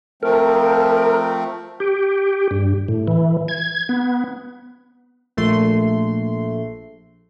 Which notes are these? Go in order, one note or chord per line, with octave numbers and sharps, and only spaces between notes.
F3 A3 C4 A#4
G4
G2
A2
E3
G#6
B3
A#1 A3 C6